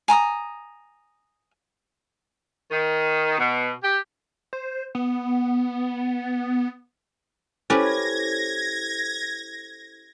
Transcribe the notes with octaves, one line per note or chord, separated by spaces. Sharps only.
G#5 A#5 C6 D#6
D#3
B2
G4
C5
B3
C#4 E4 G4 A4 B4 C5 G#6 A#6